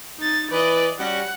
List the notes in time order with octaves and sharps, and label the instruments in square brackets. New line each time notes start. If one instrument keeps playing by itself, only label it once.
[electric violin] D#4 A6
[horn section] E3 B4 [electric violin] D5 D#5
[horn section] G3 C#4 F#4 [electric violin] F#5